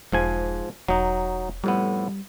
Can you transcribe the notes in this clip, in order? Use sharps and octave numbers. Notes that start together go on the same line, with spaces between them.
E1 G#2 F3 G#5
E1 F#3 D#4
F2 A2 G3 B3